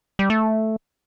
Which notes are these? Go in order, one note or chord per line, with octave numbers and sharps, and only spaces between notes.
G3
A3